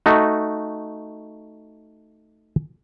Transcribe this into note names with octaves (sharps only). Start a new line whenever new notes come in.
A3 D#4 F#4